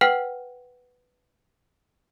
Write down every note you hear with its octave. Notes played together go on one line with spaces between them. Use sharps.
B4 F#5 G5 F6 C7